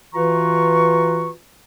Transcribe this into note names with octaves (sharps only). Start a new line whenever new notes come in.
E3 F4 F#4 B4 A#5 C#6